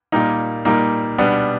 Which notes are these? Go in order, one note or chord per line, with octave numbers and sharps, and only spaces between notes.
A#2 G3 A#3 D#4
A#2 G3 A#3 D#4
B2 G3 B3 D4